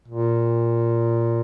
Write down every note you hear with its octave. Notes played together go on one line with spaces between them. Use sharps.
A#2